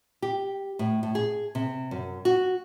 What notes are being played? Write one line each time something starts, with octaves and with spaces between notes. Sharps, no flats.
G4
A2
A2
G#4
C3
F#2
F#4